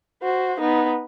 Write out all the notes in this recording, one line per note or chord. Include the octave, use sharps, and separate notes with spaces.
F#4 C5
B3 D#4